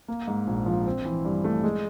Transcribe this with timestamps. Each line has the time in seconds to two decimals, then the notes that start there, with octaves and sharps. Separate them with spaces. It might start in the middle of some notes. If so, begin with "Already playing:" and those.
0.08 A#3
0.27 G#2
0.47 A#1
0.66 F3
0.86 C4
1.05 E3
1.25 G2
1.44 A3
1.64 G#3